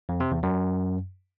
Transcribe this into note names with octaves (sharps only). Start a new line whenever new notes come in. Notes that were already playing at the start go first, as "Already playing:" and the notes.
F2
C3
E2
F#2